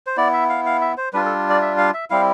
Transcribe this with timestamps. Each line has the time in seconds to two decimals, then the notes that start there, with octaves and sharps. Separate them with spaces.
0.07 C5
0.17 B3 E4 D5
0.33 E5
0.49 F5
0.66 F5
0.81 E5
0.98 C5
1.13 G3 D4 F4 B4
1.26 A4
1.50 D5
1.62 E5
1.78 F5
1.94 E5
2.10 G3 C4 E4 F5